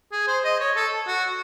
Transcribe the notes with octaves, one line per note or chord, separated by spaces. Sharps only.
G#4
C5
D#5
C#5
A4
F#4